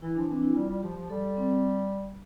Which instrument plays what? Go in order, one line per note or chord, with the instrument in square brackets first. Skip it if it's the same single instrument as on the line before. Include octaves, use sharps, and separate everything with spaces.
[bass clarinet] E3 [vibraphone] E4
[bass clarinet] F3 [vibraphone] D4
[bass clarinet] E3 [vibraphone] C4
[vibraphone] D4
E4
[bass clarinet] G3 [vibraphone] F4
[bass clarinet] G3
[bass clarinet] F3 [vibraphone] G4
[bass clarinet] F3
[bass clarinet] G3 [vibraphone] A4
[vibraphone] C4